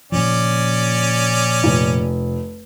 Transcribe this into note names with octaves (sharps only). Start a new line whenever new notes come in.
A#2 C#3 F3 C#4 D5
F1